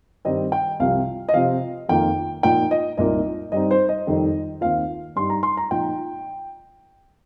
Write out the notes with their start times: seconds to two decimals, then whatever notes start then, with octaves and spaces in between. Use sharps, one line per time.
0.25 G2 D#3 G3 C4 D#4 D#5
0.52 G5
0.80 C2 C3 F3 F5
1.29 D#5
1.34 C3 F3 C4 F4 F5
1.89 F2 D#3 A#3 F4 G5
2.43 A#2 F3 D#4 G5
2.71 D#5
2.98 C2 A#2 A#3 D#4 D#5
3.52 G2 G3 C4 D#4 D#5
3.71 C5
3.89 D#5
4.07 F2 D#3 G3 C4 D#4
4.61 D#2 D#3 C4 F4 F5
5.16 G2 G3 D#4 C6
5.30 A#5
5.43 C6
5.57 A#5
5.71 A#2 F3 D#4 G5